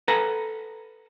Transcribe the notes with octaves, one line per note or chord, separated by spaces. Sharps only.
A4 B4 F#5 G#5 A#5